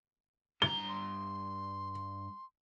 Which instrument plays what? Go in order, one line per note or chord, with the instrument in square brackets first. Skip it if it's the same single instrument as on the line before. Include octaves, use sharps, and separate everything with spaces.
[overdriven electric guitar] G2 A#5 [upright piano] G7
[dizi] C6